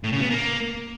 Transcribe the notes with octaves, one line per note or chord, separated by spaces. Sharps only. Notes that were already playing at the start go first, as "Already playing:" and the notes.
A2
C#3
B3
A#3